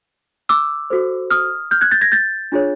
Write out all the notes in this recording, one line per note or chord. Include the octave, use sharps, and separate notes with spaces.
D6 E6
F#4 A4 C5
D#6 F6
F6 G6
F#6 G#6
G6 A6
G#6 A#6
G6 A6
D4 F4 G#4 C#5